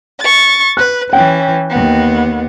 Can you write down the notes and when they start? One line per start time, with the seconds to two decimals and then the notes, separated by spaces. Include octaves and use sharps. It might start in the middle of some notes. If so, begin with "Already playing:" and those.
0.20 C#6 A6
0.77 B4 F#6
1.13 E3 C#4 G5
1.70 D#2 B3